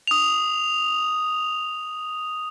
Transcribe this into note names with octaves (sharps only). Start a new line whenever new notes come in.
D#6 F7